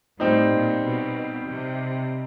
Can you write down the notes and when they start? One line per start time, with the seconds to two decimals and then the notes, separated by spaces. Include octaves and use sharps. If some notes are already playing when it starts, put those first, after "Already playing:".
0.19 A2 G3 C4 D#4
0.51 A#2
0.84 B2
1.47 C3